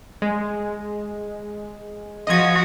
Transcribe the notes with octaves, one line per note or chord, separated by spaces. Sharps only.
G#3
F3 F#4 D#5 G#6